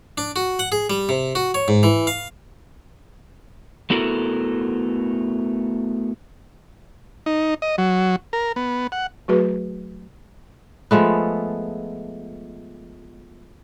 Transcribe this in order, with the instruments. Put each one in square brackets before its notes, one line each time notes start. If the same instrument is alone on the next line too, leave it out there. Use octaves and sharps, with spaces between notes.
[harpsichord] D4
F#4
F#5
G#4
G3
C3
F#4
C#5
G#2
E3
F5
[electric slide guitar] A3 B3 E4 F#4 A4 A#4
[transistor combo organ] D#4
D#5
F#3
A#4
B3
F#5
[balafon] F#3 A3 F#4 G#4 B4
[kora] F3 G#3 A3 B3